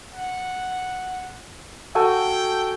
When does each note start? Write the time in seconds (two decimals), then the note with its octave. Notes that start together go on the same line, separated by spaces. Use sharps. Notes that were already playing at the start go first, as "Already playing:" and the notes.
0.13 F#5
1.95 F#4 A4 G5 G#5